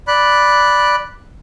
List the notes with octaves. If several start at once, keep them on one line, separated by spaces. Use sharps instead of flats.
D5 B5 F#6